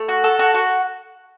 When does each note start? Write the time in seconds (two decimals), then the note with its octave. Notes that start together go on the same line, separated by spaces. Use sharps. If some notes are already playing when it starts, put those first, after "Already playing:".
Already playing: A3
0.08 F#4
0.24 A4
0.39 F#4
0.54 F#4